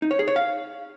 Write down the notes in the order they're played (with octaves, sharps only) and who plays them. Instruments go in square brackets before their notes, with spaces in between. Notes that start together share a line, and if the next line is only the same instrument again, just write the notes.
[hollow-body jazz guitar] D#4
C#5
G#4
C#5
F5